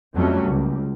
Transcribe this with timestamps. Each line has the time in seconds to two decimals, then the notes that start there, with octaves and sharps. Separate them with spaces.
0.15 F2 F#3 G3 A3 C#4
0.47 C#2